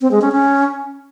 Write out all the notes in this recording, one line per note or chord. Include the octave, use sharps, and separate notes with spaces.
C4
G#3
C#4
C#4